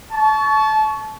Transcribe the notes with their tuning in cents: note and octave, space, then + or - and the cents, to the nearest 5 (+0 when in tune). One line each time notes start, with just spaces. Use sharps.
A5 -25 C#6 +20